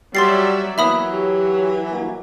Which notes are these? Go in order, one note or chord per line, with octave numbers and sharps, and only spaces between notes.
F#3 G3 D5 E5 C6 A6 C7
E3 F#3 A#3 B3 E5 B5 D#6
G4
G2 A#3 F#4